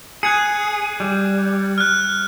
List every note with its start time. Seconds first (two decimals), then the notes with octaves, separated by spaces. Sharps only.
0.23 G#4 F#6 G#6 C#7
1.00 G3
1.78 F6 F#6